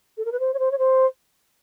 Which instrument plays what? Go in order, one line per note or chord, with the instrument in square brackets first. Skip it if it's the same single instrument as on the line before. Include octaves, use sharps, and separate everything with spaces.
[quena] A4
A#4
B4
C5
C#5
C5
C#5
C5